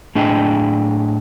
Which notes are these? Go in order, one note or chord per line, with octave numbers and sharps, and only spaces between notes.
A2 D4 G#4 D#5 G5 G#5